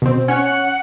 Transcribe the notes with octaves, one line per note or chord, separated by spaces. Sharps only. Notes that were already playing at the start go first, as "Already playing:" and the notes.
B2 C4
C#4 C#5 F#5